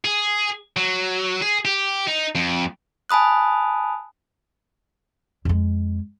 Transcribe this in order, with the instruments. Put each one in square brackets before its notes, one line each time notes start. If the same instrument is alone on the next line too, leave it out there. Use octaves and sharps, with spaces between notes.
[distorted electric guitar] G#4
F#3
G#4
G4
D#4
F2
[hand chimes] G#5 A5 B5 D#6 F#6
[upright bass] F2 G#3